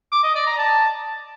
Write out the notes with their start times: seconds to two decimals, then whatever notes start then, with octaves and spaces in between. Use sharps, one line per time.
0.12 D6
0.24 D#5
0.35 D5
0.47 A#5
0.58 A5